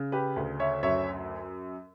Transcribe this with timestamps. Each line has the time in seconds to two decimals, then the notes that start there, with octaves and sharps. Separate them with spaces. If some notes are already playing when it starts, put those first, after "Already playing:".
Already playing: C#3
0.12 G4 B4
0.36 D2
0.60 C#5 E5
0.83 F#2 C#5 E5